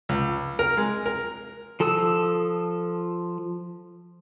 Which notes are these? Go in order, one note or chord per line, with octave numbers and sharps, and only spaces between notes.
C#2
A#4
G#3
A#4
F3 A4 A5 D#6 E6